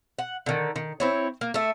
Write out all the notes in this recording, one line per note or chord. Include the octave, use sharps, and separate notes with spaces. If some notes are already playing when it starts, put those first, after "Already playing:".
F#5
D3 D#3
D#3
C4 E4 C#5
A#3
A3 E5